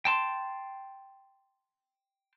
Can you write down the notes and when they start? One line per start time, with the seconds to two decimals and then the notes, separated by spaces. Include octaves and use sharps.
0.05 G5 A5 C6